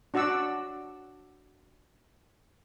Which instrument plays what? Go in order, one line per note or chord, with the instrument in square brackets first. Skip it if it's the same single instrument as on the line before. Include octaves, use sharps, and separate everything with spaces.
[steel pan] D4 F#4 D5 F#5 E6